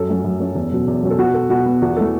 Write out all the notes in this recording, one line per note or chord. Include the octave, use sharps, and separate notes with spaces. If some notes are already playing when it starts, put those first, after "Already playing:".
Already playing: F#2 A4
F#3 A3 C#4
F#2
F#3 A3 C#4
E2
B2 F#3 C#4
E2
B2 F#3 C#4
A4
B2 F#4
B3 A4
B2 F#4
B3
E2 F#4
E3 A3 A4